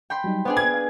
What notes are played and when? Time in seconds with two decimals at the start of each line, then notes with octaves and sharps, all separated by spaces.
0.10 G5 B5 C6
0.24 F#3 G3 D#4
0.45 B3 D4 G#4 C5 F#5
0.57 G#6
0.74 F5 G#5